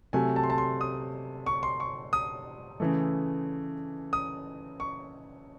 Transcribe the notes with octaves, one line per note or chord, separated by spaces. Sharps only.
C3 F#3 A3 G#5
A5
C6
A5
C6
D#6
C#6
C6
C#6
D#6
C#3 E3 A3
D#6
C#6